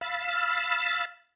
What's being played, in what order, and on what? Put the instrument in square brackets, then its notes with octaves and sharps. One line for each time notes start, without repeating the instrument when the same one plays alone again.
[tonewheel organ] F5 B5 E6 A6